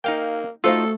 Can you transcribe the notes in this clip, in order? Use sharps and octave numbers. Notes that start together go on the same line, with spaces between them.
A#3 D#4 F5 G5
A3 D#4 F4 F#4 A4 C5 F5